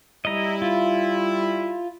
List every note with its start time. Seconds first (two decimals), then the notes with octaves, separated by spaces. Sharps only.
0.25 G3 E4 D#5 A#5
0.62 F4